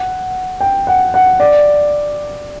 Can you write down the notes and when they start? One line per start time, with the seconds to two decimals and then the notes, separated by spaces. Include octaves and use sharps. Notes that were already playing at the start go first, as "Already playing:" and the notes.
Already playing: F#5
0.60 G5
0.87 F#5
1.14 F#5
1.40 D5